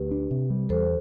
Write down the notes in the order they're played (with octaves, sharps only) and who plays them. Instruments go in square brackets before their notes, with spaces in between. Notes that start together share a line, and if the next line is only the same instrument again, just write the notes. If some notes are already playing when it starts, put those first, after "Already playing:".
Already playing: [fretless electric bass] D2 [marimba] G4 B4
[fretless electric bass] D4
C3
G3
[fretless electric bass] E2 [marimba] A4 C5